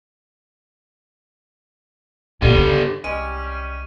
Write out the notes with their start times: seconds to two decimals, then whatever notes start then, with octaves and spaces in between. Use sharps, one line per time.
2.42 F#2 A#2 D3 G3
2.56 C#3
3.04 C2 G3 G#3 C#4 D#7